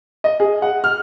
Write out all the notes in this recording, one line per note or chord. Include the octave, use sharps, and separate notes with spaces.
D#5
G#4
F#5
F6